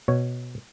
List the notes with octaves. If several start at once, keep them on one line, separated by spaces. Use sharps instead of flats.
B2 C#5